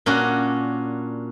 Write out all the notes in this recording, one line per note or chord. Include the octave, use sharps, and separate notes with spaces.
A#2 C#4 D4 F#4